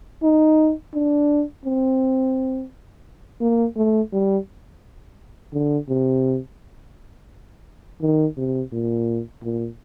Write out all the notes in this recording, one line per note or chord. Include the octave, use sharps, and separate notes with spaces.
D#4
D4
C4
A#3
A3
G3
D3
C3
D#3
C3
A#2
A#2